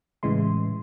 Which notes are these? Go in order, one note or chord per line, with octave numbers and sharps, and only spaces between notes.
A2 C#3 E3 G#3 C6